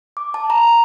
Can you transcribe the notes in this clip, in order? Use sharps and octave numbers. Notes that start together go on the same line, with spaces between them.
D6
A5
A#5